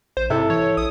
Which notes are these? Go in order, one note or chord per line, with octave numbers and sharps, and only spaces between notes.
A#1 C5
G#2 C3 E4 A4
E3 C#5
A#1 D#6